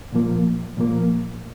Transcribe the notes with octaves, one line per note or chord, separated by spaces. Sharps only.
A#2 F3 A#3
A#2 F3 A#3